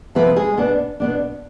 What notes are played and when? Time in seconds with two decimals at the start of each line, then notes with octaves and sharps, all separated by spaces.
0.15 C3 F3 B3 C4 B4
0.36 G#3 G#4
0.57 B2 B3 D4
1.00 B2 B3 D4